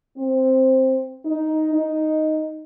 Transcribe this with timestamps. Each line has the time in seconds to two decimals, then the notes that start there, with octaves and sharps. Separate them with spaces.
0.16 C4
1.25 D#4
1.74 D#4